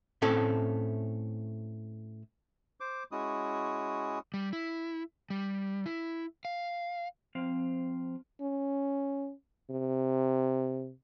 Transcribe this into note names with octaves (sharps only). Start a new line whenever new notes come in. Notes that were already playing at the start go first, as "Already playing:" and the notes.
A2 A3 C4 C#4 A4
C5 D6
G#3 C#4 E4 F#4 D#6
G3
E4
G3
E4
F5
F3 C4 F5
C#4
C3